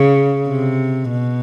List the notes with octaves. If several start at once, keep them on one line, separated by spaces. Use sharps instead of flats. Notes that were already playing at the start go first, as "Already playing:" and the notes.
Already playing: C#3
C3
B2